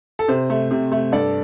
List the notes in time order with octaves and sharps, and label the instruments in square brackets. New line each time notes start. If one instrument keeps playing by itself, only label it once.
[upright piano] A4
C3 C5
A3
C3
A3
G2 A4 D5